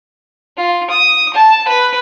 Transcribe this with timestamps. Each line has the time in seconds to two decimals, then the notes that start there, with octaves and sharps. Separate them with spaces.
0.57 F4
0.90 D#6
1.34 A5
1.68 B4